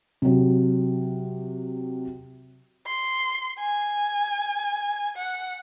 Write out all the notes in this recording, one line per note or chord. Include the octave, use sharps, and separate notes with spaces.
C3 F#3
C6
G#5
F#5